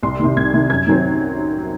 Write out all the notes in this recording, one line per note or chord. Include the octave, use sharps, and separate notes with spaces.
C2 C6
C3 D#3
C2 G#6
C3 D#3
F#2 G#6
D#3 F#3 C4